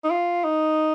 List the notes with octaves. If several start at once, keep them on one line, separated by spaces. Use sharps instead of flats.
D#4
F4
D#4